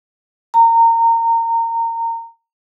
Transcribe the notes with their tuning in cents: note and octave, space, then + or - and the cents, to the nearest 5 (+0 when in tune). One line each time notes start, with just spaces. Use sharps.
A#5 -25